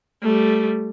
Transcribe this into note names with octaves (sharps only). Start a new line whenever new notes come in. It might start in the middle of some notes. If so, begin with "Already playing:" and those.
G3 A3